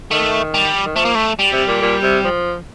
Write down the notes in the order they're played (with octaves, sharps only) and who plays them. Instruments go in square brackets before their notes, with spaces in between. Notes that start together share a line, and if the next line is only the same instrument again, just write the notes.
[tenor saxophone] D#3 [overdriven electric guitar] A3
[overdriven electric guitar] G3
[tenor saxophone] D#3
[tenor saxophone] F3 [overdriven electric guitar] A3
[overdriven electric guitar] A#3
A3
G3
[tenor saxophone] C3
A#2
A#2
C3
F3